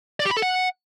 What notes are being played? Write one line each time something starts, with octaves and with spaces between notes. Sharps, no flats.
D5
G4
B5
A4
F#5